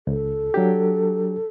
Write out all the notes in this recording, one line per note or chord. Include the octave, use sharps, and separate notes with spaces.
C#2 A4
F#3 D4 G4